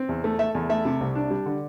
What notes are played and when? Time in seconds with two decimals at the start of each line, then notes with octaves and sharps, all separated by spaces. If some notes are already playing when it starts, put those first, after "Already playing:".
Already playing: C4
0.09 E2
0.24 A3
0.39 A3 E5
0.55 E2
0.69 A3 E5
0.85 C3
1.01 C2
1.15 D4
1.30 G3
1.46 D3